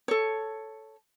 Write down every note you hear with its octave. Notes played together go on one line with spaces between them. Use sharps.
A4 C#5